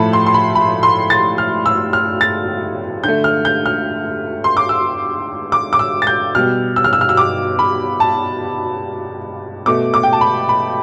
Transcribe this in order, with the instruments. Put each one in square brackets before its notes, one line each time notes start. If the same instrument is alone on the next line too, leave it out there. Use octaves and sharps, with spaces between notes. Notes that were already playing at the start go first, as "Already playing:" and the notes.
Already playing: [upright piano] A2 F3 A3 A5 B5
C6
C6
B5
B5
C6
A6
F6
E6
F6
A6
D3 A3 G6
F6
G6
F6
C6
D6
E6
D6
D6
E6
A6
G6
B2 G3 F6
E6
F6
E6
F6
E6
D6
B5
A5
B2 A3 D6
D6
G5
A5
B5
B5